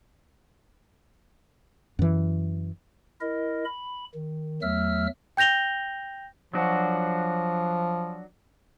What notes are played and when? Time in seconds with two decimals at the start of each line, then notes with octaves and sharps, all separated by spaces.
1.99 F#2 E3
3.21 E4 A#4 D#5
3.65 B5
4.14 D#3
4.62 E2 F#3 A3 E5 E6 F6
5.37 G5 G6 A#6 F7 G7
6.54 F3 F#3 D4 F#4